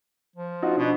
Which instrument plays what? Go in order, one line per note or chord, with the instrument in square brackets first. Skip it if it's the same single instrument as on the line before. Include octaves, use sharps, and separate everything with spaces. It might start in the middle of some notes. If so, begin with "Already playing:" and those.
[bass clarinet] F3
[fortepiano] D#4 F4 F#4
[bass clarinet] B2 [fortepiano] D4